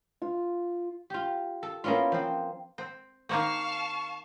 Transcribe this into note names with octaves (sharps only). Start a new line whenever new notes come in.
F4
F4 G4
A4
A#3 B3 C#4 E4 F4
F3 C4
C4
D#3 A#3 C4 F5 A5 C#6